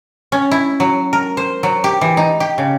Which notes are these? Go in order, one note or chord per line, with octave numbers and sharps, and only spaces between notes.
C#4
E4
F#3
A#4
C5
F#3
G4
E3
D#4
G4
C#3